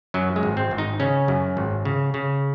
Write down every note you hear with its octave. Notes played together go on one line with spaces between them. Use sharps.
F#2 F#3
G#3
G#1
C4
G#1
D#4
C#3 C#4
F#2
G#1
C#3
C#3